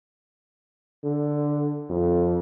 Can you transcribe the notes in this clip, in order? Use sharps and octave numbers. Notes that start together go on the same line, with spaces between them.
D3
F2